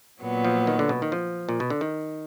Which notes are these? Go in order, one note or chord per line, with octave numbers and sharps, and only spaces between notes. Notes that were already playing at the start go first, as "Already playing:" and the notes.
A#2 F#3 B3
F3
D#3
D3
B2
D#3
F3
A#2
B2
D3
D#3